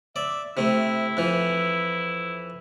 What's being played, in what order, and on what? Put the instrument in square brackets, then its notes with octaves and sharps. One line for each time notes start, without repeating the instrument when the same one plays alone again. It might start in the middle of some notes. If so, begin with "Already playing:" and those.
[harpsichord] D5 [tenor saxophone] E5
[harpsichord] C3 A3 [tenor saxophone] E4
[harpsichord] F2 E3